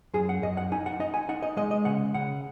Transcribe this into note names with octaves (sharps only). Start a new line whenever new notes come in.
F#2 G#4
F#5
F#2 D#5
F#5
D#4 G#5
F#5
D#4 D#5
G#5
D#4 F#5
D#5
G#3 D#5
D#5
C#3 F#5
C#3 F#5